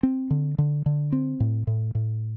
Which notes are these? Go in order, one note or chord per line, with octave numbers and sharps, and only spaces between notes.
C4
D3
D3
D3
C4
A2
A2
A2